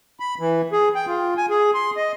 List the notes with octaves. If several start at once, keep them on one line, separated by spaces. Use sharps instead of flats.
B5
E3
G#4
G5
F4
G#5
G#4
C6
D#5